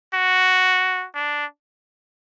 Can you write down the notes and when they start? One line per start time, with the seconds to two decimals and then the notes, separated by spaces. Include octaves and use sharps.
0.14 F#4
1.15 D4